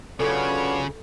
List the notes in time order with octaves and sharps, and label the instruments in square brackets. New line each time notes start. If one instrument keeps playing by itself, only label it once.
[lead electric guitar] C#3 [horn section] F#3 F4 C#5 [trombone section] B3 D4 [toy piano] A4